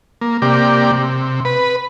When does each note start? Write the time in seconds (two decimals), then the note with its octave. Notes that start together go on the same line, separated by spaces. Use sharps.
0.21 A#3
0.42 C3 A#3 G4 D5
0.91 C3
1.45 B4